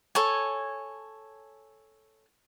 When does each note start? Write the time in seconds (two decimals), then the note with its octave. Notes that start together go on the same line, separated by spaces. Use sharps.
0.15 A4 C#5 G#5